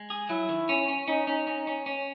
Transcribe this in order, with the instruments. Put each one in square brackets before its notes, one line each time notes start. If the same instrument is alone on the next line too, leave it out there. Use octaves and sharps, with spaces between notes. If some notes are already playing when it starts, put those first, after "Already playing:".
Already playing: [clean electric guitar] G#3
G#4
[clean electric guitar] F#3 [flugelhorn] E4
[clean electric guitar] D#3
C#4
C#4
[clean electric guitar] C#4 [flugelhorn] D#4
[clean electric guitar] C#4
C#4
C#4
C#4